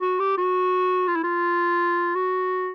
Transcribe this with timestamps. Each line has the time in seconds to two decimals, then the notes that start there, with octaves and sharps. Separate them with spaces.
0.01 F#4
0.20 G4
0.38 F#4
1.07 F4
1.16 E4
1.23 F4
2.15 F#4